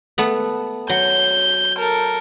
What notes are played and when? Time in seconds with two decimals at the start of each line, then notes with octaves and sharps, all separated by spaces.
0.18 A3 B3
0.89 F#3 G6
1.78 A4 A#4